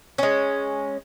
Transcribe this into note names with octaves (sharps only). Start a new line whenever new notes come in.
G#3 C#4